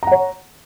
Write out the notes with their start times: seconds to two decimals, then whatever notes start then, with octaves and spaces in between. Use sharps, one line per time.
0.03 A#5
0.07 F#5
0.12 C#5